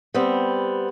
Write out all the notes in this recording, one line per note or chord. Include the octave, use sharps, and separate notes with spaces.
G3 B3 C4